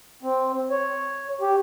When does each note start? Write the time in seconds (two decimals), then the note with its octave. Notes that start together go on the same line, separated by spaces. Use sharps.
0.23 C4
0.70 C#5
1.41 G4